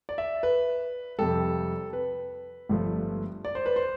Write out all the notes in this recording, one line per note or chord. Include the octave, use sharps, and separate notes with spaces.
D5
E5
B4
F2 C3 G3 A4
B4
G1 G2 F3 A3
D5
C5
B4
C5